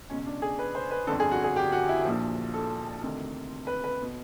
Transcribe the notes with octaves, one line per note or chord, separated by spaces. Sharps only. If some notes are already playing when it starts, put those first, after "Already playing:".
C#2 B2 C#4
D4
G#4
B4
C5
B4
G1 F2 D3 A4
G#4
F#4
G#4
G4
F#4
E4
A#1 A#2 F3
A4
D2 C3 D#3
B4
B4
B2